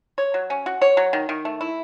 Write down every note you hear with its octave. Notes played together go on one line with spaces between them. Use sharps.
C#5
F#3
C#4
F#4
C#5
F#3
D#3
D#3
A3
E4